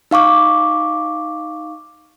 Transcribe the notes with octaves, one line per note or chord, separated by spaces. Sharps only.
D#4 F5 C#6 D6